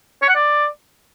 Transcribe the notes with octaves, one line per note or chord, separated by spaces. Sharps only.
C#5
F#5
D5